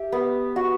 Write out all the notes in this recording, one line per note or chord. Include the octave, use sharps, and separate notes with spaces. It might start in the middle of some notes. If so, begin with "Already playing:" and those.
Already playing: G4 E5
B3
F#4